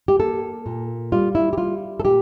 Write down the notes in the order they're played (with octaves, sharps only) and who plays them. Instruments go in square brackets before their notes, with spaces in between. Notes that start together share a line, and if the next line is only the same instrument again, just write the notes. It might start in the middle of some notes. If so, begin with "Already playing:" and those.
[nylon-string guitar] G4
A#3 A4
A#2
G3 F4
E4
G4
G3 F4
A4
A#2 G4